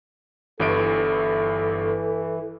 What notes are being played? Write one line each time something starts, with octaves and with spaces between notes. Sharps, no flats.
G1 G2 E3 A4 D7